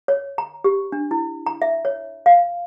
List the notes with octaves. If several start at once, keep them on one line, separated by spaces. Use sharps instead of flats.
C#5
A#5
G4
D4
E4
A#5
E5
C#5
F5